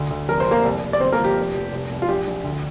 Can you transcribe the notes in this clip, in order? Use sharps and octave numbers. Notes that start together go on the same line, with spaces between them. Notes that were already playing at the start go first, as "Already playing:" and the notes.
Already playing: D2
D2
F1 A#4
C5
F1 A#3 A#4
C2
C2
D5
G1 C4 C5
A#3 A#4
F3
G4
F1
F1
C2
C2
F4
A#1 G4
A#1
D2